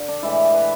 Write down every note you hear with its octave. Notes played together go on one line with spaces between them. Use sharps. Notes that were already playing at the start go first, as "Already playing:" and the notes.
Already playing: D3
D4
A2 E3 G#3 E4
B4